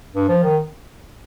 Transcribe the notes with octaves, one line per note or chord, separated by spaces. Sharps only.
G2
F3
D#3